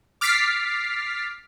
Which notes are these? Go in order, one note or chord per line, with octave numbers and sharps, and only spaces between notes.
D6 F6 A6 B6 C7